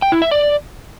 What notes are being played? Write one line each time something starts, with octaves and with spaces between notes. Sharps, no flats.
G5
E4
E5
D5